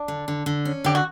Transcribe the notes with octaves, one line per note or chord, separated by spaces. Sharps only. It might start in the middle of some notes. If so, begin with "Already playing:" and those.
Already playing: D4
D3
D3
D3
C#4
D3 G4
F#4